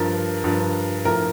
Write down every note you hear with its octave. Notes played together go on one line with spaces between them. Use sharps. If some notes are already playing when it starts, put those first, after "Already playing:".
Already playing: G2 F3 A#4
G2 F3
A2 F3 A#4